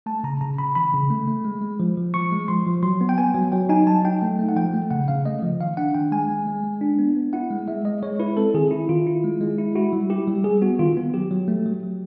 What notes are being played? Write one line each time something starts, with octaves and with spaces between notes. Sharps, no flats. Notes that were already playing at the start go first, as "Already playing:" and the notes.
A3 A5
C#3 A#5
C#3 A#5
C#3 B5
E3 B5
C#3
A3
A3
G#3
G#3
F3
F3
F3 C#6
G#3
F3 C6
F3
F#3 C6
B3
G5
B3 G#5
F#3
F#3 G5
D#4 G#5
F#3 A5
D#4 G5
A3 G5
A3
F#5
F3 G5
A3
C#3 F#5
C#3 F5
A3 D#5
F3
D#3 F5
D4 F#5
D#3 G5
G#3 G#5
G#3
G#3
G#3
D4
B3
B3
E4 F#5
G#3
G#3 E5
G#3 D#5
G#3 C#5
E4 B4
C4 A4
D#3 G#4
E4
D#3 F4
E4
G#3
G#3
E4
E4 F#4
G3
E4 G4
G3
G3 G#4
B3 F#4
D#3 F4
B3
F#3 G4
F#3
A3
F#3
F#3